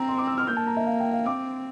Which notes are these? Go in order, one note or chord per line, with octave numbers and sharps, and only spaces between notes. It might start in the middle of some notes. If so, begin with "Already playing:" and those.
Already playing: C4 A#5
C6
D6
E6
F6
A#3 G6
A5
A#5
E5
F5
G5
F5
C4 D6